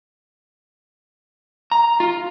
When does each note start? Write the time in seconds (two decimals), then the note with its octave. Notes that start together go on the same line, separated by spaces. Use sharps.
1.72 A#5
2.00 F4